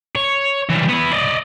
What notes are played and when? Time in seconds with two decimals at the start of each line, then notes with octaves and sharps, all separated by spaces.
0.16 C#5
0.69 E3 G3
0.89 B3 E4
1.13 D5 D#5